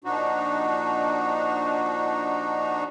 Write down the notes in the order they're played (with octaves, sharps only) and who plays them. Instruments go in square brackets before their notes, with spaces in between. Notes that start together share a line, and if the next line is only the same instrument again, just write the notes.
[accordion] A#2 F3 D4 D#4 F#4